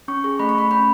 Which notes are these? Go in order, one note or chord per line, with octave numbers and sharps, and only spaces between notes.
C#4 C#6
G#4 C#6
A3 B5
C#6
A3 B5
C#4 B5